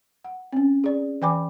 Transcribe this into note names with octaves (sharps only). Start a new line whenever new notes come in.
F#5
C4 C#4
G#4 D5
E3 D5 G5 G#5 B5 D6